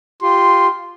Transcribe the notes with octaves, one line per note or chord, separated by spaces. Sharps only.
F4 G4 C6